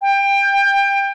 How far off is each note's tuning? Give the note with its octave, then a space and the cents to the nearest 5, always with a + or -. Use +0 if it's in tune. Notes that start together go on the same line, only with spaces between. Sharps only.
G5 +20